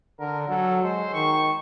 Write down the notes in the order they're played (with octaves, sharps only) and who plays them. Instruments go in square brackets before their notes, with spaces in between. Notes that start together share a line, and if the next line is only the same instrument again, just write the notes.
[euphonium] D3 [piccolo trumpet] A#4
[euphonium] F#3 [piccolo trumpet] A4
[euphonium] G#3 [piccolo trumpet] C5
[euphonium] D#3 [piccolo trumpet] C#6